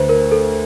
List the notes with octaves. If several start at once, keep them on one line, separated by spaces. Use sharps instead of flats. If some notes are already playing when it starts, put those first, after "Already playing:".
Already playing: D2 D3 B4 C5
A#4
A4